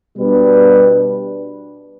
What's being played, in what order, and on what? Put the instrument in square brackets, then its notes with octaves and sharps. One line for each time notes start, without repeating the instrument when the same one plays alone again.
[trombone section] B2 G3 D4 B4